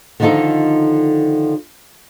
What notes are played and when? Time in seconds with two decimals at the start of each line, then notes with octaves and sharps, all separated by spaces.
0.20 D3 D#3 F3 D#4 F4 A4